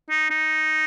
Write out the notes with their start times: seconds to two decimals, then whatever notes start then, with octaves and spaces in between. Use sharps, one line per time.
0.10 D#4
0.31 D#4